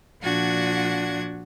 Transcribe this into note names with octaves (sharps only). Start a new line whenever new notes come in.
A#2 F3 D4 F#4 F#5 G#6